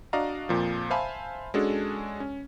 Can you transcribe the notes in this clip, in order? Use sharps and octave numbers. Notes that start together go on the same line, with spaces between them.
D4 F#4 D5 D#5 F5 A#5
F2 A#2 F3
C5 E5 F5 G#5 A5 B5
G#3 C#4 D4 F#4 G#4 A4
C#4